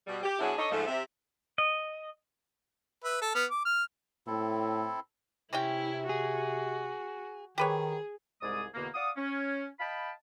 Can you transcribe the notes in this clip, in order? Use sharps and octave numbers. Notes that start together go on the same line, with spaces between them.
B2 G3
G4
B2 F#3 D4 E4 F#4 G#4
D4 A4 C#5 D#5
G#2 F3 A3
C3 E5
D#5
B4 E5
A4
B3 F6
D6
F6
A2 C4 E4 A4
C3 C4 C#4 E4 G5
F#4 G#4
D#3 G4 G#4 B4 C#5
C2 G#2 G#3 G#4 D5 D#6
E2 B2 D3 A#3
D5 F5 F#5 D6 D#6
C#4
D#5 F5 G5 A5 B5